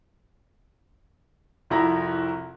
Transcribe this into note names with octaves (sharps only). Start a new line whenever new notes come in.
C2 F2 E4 F#4 A#5 A#6